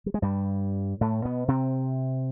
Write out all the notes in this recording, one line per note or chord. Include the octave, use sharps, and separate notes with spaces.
G3
G#3
G2 G3
A2 A3
B2 B3
C3 C4